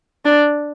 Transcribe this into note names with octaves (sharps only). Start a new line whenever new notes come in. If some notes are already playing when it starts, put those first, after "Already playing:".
D4